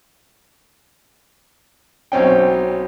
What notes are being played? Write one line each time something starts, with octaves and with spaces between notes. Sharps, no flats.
B1 C4 C#4 G5